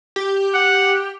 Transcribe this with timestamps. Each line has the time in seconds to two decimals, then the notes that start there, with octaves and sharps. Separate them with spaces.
0.16 G4
0.54 F#5